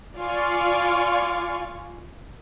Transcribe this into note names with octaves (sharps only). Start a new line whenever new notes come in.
F4 D5 F5 G#5 C#6